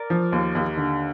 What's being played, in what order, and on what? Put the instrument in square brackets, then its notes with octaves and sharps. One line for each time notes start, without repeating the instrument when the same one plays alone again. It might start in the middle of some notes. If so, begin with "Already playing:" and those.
Already playing: [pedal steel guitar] A#4 D5
[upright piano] F3
D#2
D#2
D3